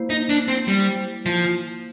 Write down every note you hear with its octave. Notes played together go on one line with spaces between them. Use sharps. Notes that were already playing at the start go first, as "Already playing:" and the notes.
Already playing: A#3 E4 C5
D#4
D4
C4
G3
F3